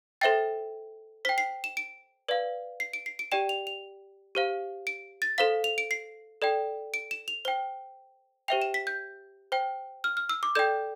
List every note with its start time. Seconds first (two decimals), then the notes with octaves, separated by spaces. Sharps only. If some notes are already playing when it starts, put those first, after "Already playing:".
0.21 A4 C5 E5 G5 A6
1.25 C5 G5 B6
1.38 C7
1.64 E7
1.77 D7
2.28 B4 D5 F5
2.80 C7
2.93 D7
3.06 C7
3.19 D7
3.32 G4 D5 G5 E7
3.49 F7
3.67 F7
4.35 G4 C5 F5
4.87 D7
5.22 A6
5.38 A4 C5 F5 B6
5.64 F7
5.78 D7
5.91 C7
6.42 A4 D5 G5
6.94 D7
7.11 E7
7.28 F7
7.45 C5 G5 G7
8.48 G4 C5 E5 G5 F7
8.62 E7
8.74 B6
8.87 G6
9.52 C5 G5
10.04 F6
10.17 F6
10.29 E6
10.43 D6
10.55 A4 D5 G5 G6